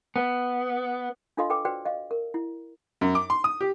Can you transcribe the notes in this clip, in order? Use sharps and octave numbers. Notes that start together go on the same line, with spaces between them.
B3
D4 F4 A4 D#5 F5 C6
A4 B4 G5 D6
F#4 B4 C5 D5 G5
D#5 F5
A#4
E4
F#2
D6
C6
D#6
G4